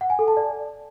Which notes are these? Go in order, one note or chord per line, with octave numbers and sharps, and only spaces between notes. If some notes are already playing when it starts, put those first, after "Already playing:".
F#5
G#5
A4
A5
D5